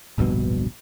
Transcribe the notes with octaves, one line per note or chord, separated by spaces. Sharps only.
D1 A#1 G2 B2